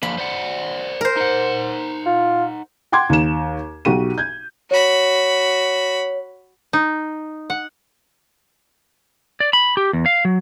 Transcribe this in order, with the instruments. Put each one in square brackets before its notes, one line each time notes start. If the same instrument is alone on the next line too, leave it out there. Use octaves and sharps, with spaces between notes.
[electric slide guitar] D3 F3 A#3 [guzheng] B5
[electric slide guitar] C5 D5 F#5
[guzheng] A#4 C5
[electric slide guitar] D#4 F#5
[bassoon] F4
[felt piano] F#5 G5 C6 D6 G#6
D#2 E7
B1 F#4 G4 D#7
G6 G#6
[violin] F#4 B5 [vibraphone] C#5
[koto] D#4
F#5
[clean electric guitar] D5
B5
G4
E2
F5
F#3